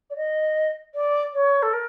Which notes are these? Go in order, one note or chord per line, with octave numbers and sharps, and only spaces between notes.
D5
D#5
D5
C#5
A4
A#4